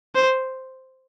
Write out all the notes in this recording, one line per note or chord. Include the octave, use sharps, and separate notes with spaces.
C5